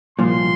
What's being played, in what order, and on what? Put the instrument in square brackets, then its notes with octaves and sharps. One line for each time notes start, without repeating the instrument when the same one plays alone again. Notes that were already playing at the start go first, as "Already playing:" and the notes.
[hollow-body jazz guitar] C2 A#2 F3 [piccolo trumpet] C6